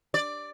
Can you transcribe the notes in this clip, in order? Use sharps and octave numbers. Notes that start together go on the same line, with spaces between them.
D5